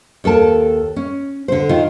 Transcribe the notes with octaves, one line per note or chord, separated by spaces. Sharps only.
D#2 A4 A#4 A5
C#4
D3 C5
D#3 F4